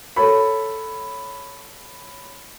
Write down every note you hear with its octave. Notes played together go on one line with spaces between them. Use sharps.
A4 C#5 A5 B5